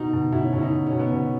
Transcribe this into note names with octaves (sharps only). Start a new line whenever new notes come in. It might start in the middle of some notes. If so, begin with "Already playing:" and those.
Already playing: B2 D#4
B2
B2 E4
C#4
B2 C#4 E4
D#4
B2
C#4
B2
B3
B2 C#4